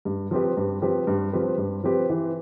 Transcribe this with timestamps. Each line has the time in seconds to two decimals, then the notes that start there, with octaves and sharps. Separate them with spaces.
0.05 G2
0.31 F3 C4 G4 B4
0.57 G2
0.82 F3 C4 G4 B4
1.07 G2
1.33 F3 C4 G4 B4
1.58 G2
1.84 F3 C4 G4 B4
2.10 E3